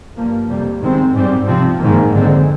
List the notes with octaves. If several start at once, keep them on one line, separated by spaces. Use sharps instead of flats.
G2 F3 A#3
F2 C3 G3 A#3
G#2 D#3 G#3 C4
G#2 G3 C4
C3 F3 C4
G#2 D#3 A#3
F2 D3 G#3 C4